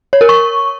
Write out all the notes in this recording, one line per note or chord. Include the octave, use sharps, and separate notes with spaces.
C#5
A#4
C#6